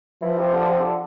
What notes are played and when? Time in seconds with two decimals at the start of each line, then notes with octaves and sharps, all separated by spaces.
0.22 E3 F3
0.38 C3
0.53 D3
0.68 C3
0.80 D3